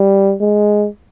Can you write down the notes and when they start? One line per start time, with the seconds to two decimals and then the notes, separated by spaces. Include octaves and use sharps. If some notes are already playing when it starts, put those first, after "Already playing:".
Already playing: G3
0.41 G#3